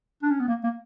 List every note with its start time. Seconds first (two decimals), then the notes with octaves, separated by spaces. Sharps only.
0.23 D4
0.31 C#4
0.40 B3
0.48 A#3
0.64 A#3